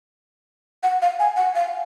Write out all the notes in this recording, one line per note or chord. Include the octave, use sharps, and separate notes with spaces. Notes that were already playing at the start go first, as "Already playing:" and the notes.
F#5
F5
G#5
F#5
F5